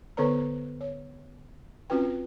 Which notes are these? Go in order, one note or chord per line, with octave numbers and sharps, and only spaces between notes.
D3 B3 A4 B4 C#5 A#5
C#5
C4 C#4 F4 F#4 B4 G5